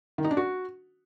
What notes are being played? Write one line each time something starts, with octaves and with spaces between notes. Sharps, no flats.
D#3
D#4
D4
F#4